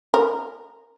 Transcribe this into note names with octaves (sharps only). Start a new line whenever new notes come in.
A#4